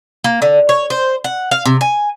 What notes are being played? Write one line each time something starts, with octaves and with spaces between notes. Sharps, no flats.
A#3
D3
C#5
C5
F#5
F5
C3
G#5